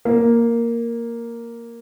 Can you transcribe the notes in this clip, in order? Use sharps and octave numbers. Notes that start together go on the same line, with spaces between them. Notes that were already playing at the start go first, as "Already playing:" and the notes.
A#3